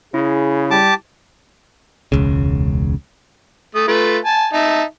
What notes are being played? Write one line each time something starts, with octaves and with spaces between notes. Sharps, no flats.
C#3 E4 G#4
G3 G4 A5 D6
E1 C#2 C#3
A3 D#6
A3 F4 B4
G#5 A5
D#4 E5 A5